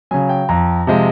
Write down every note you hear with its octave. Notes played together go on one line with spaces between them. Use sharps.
C#3 F#3 G#5
G5
F2 A#5
C3 F3 G#3